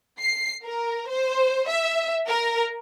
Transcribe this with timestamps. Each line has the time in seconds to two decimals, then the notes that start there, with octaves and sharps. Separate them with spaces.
0.20 C7
0.64 A#4
1.08 C5
1.68 E5
2.27 A#4